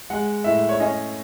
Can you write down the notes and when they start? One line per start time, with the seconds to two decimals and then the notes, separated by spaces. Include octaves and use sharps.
0.10 G#3 F#5
0.44 A2 E5
0.69 C#5
0.80 C#4 D#5